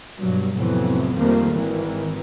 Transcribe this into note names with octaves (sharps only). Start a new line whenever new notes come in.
G2 B2 F#3
F2 A2 C3 E3 F#3 B3
F2 D#3 F3 G3 A3 A#3
G#1 D#3 E3